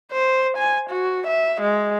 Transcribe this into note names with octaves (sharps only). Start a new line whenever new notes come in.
C5
G#5
F#4
E5
G#3